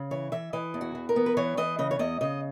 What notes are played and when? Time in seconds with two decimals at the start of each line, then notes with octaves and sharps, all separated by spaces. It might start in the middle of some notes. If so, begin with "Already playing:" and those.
Already playing: C#3
0.11 E3 C#5
0.32 E3 E5
0.53 E3 D#5
0.74 E2
0.81 F#4
0.95 E3
1.09 A#4
1.16 B3
1.26 B4
1.37 E3 C#5
1.57 E3 D#5
1.79 C#3 D#5
1.91 C#5
1.99 E2 D#5
2.21 C#3 D#5